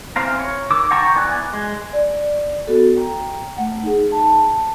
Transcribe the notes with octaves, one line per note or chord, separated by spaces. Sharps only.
E3 C4 C5 F5 A#5
C#5
D#3 D6 E6
F#5 G5 A5 A#5 C#6
E3 B3 D5 G#5 F#6
G#3
D5
B3 F#4 A4
G5 A#5
A3 F#5
D#4 G#4
A5